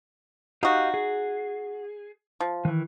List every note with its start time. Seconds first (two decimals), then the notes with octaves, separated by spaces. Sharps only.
0.63 D#4 F#4 G4 D#5 F5
0.94 G#4
2.40 F3
2.65 D#3 E3